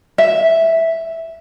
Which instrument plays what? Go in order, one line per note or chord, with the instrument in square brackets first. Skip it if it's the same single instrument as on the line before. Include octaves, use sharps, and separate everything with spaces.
[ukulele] E5